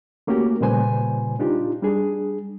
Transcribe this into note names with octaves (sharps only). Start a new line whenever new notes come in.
A3 A#3 C#4 F#4 G4 A#4
A#2 C#3 G3 B4 C5 G#5
D4 D#4 F4 G4
G3 D4 G#4